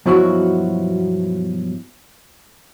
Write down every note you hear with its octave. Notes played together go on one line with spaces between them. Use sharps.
G2 B2 F3 F#3 E4 F#4